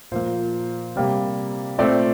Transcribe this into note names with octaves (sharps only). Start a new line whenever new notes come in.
A#2 F3 A#3 C5
C3 G3 A#3
A#2 A3 C4 D5